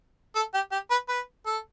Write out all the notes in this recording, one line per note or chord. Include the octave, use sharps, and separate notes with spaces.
A4
G4
G4
B4
B4
A4